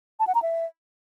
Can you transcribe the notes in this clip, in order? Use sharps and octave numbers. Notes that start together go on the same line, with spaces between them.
A5
F#5
A#5
E5